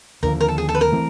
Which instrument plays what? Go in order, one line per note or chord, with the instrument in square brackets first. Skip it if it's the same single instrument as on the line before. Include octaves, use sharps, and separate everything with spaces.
[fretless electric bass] D#2 D3 F3 [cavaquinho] A#4
[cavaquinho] A#4
A4
G#4
A4
B4
A#4
[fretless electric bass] E3 A3 C4